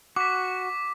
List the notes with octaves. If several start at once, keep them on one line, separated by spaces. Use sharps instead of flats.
F#4 D6 B6